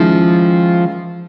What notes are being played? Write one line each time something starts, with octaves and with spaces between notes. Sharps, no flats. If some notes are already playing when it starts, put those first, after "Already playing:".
Already playing: D#3 F3 G#3 C#4 E4